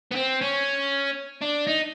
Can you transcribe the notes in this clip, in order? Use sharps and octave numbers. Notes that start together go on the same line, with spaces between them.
B3
C4
C#4
D4
D#4